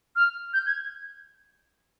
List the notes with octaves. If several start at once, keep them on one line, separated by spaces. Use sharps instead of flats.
F6
G6
G#6